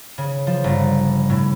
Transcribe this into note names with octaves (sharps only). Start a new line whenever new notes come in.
C#3
F3
G1
A2